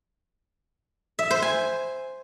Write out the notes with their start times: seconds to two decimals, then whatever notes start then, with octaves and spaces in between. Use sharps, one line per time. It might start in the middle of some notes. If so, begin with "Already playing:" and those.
1.19 E5
1.31 C5
1.42 G#5